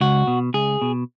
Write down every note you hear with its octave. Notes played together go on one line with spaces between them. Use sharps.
C#2 F#4
B2
C#2 G#4
B2